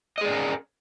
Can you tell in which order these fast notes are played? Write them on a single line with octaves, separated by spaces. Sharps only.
D#5 G#4 D5 C#4 A#4